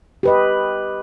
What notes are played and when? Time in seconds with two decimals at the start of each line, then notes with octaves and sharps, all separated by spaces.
0.23 G4 B4 D#5